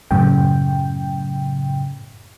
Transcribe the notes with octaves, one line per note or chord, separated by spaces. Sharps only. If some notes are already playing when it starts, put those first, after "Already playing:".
F#2 A2 C#3 G5